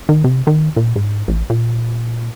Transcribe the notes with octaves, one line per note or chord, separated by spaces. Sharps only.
D#3
C3
D#3
A#2
G#2
A1
A#2